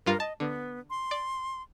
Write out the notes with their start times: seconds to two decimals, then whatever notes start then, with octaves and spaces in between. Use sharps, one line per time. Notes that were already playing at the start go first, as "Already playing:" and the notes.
0.06 G2 G3 F4 A#4
0.20 D#5 A5
0.40 D3 B3
0.90 C6
1.11 D5